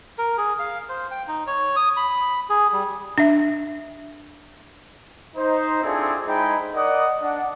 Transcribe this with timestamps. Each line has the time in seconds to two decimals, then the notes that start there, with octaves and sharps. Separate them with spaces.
0.18 A#4
0.38 G#4
0.59 F5
0.89 C5
1.11 G5
1.28 D#4
1.47 C#5
1.76 D#6
1.97 B5
2.50 G#4
2.72 G3
3.18 D4 E5
5.37 D#4 C5
5.83 C4 D4 E4 F4 G#4 A4
6.26 G#3 D#4 E4 C5 G5 B5
6.74 A#4 D5 D#5 F#5 D#6
7.22 D4 F#5